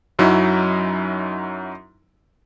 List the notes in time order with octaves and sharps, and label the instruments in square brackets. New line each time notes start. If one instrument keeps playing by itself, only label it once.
[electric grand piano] F#2 F#3 C#4 D#4 E4